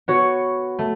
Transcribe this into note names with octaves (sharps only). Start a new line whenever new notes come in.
B3 F#4 C#5
A3